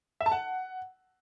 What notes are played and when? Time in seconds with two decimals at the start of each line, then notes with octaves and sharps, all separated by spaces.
0.21 E5
0.26 A5
0.32 F#5